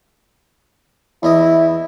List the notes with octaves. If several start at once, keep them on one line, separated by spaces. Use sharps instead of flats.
E2 E4 D#5 D#6